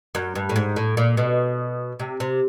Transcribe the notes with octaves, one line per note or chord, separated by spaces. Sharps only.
F#2
G2
A2
G#2
A2
A#2
B2
C3
C3